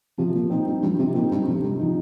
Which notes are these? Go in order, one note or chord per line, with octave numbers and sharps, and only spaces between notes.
C3 F3
A#2
A#2 C4 D#4
G2
G2 F3
C3
A#2 C4 D#4
G2
F2 C3
G2
F3 D#4